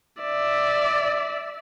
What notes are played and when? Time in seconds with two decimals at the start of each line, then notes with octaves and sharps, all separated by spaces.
0.21 D5 E5